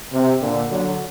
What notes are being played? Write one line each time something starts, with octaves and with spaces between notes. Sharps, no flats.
C3
A#2 D3
D3 F#3